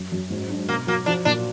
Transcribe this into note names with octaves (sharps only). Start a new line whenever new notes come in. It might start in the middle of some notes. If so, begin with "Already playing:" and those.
Already playing: F#2
F#2
G#2
D4
B2 A#3
F#3 A#3
F3 D4
A#2 D4